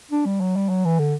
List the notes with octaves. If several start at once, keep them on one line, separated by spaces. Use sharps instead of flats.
D4
G3
F#3
G3
F#3
E3
D3